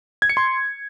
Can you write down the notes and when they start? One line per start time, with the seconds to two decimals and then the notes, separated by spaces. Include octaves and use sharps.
0.22 G#6
0.29 C#7
0.37 C6